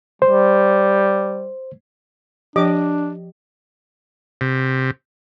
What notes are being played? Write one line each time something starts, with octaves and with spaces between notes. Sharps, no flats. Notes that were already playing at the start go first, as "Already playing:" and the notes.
G3 C5
F3 D4 G4 D#5 D6
C3